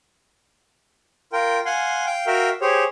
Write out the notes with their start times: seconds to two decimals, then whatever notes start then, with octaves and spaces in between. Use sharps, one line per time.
1.33 F4 A#4 G5
1.65 F5 F#5 G#5 C6
2.06 F5 G5 G6
2.27 F#4 A#4 E5 F5 G5 F6
2.61 G4 G#4 C5 C#5